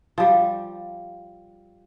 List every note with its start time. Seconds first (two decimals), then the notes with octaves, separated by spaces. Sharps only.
0.18 F3 G3